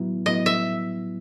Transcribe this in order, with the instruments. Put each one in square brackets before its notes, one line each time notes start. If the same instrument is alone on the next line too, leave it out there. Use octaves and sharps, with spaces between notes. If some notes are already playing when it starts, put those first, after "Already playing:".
Already playing: [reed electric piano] A2 F#3 B3 E4
[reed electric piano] A2 F#3 B3 E4 [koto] D#5
[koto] E5